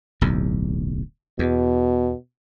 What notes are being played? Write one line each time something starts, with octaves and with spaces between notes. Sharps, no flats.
D1 B1 E2
E2 B2